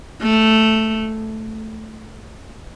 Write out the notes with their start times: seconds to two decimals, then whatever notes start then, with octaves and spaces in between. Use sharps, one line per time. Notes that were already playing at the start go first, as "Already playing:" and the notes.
0.22 A3